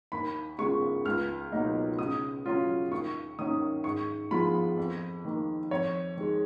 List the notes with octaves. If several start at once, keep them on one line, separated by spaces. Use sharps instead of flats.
D#2 B5
C#3 G#3 B3 F4 C#6
C#2 F6
B2 F#3 A#3 D#4
C#3 D#6
F#3 C#4 F4
D#2 C#6
D#3 A#3 C#4 D#6
G#2 C#6
F3 G#3 B3 F4 B5
F2
D#3 A#3
F2 C#5
D#3 G#3